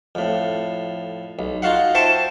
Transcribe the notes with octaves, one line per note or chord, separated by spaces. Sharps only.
F2 A2
B1
D#4 F4 F#4 F5 F#5
C5 E5 G5 A5 C#6